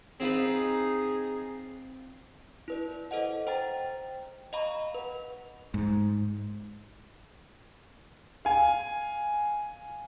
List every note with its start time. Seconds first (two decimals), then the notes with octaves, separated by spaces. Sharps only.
0.20 C4 D#4 F4 G#4 B4
2.68 E4 B4 D5
3.11 A4 C5 D#5 F#5
3.47 C5 G5 A#5 A6
4.53 D#5 F5 A#5 B5 C#6
4.95 B4 F#5
5.74 G#2
8.45 F5 G#5